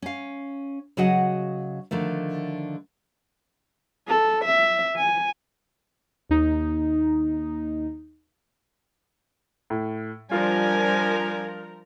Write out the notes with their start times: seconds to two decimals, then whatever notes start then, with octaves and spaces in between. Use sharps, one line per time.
0.02 C#4 F5
0.97 C#3 F#3 F#4 D#5 F#5
1.91 D3 D#3 F3 A3
4.08 A4
4.45 E5
4.96 G#5
6.29 D#2 D#4
9.70 A2
10.31 F3 G3 D4 F4 A#4 G#5 A#5